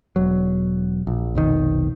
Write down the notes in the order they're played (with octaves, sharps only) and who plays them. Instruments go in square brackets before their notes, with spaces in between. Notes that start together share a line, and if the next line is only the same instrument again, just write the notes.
[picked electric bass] E1 F#3
A#1
F1 B1 D#3